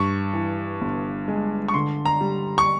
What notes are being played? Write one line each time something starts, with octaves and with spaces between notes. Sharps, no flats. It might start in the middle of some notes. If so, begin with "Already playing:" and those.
Already playing: G2 C#6
E3
G1
G#3
C#6
D3 C6
A#5
G3
C#6